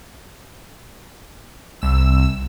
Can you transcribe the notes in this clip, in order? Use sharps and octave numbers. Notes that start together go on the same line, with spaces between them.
C2 E6